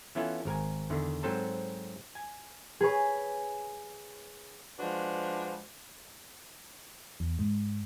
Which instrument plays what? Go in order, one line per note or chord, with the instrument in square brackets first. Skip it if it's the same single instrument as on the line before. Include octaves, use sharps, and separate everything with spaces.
[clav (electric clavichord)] E3 B3 C#4 E4 F4 A4
G#1 A#4 G#5
E2 D3 D#3
G#2 F#3 C4 A4 C5 A5
G#5
[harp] G#4 B4 C#5
[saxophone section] F3 G#3 D4 F#4 B4
[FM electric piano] E2
G#2